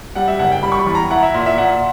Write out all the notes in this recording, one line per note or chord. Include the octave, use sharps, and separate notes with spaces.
G3 F#5
E5
F#1 F#5
G5
G3 B5
C#6
B5
E2
A#5
E4 F#5
E5
A#2
E5
A#2 F#5